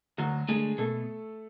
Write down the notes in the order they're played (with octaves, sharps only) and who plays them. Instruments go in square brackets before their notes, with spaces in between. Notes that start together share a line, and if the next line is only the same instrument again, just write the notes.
[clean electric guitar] D2 [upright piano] F#3 F#4
[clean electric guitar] D3 A3 [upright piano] G#3 G#4
[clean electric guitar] B2 [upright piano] A3 A4